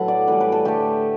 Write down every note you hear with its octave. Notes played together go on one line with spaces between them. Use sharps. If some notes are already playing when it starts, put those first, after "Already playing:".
Already playing: A2 F#3 A3 A4 B4 F#5
D5
A2 E3 G3 B4
B4
A4
D3 A3 G4